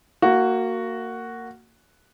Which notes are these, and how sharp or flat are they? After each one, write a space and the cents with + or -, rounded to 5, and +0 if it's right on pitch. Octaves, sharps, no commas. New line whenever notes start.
A#3 -20 F#4 +0